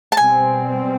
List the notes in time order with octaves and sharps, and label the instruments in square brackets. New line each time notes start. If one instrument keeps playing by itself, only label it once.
[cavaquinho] A5
[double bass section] B2 G3 C4 [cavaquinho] G#5